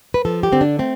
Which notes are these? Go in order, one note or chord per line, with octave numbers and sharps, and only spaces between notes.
B4
F3 A4
G4
D3 C4
D4
A3 C4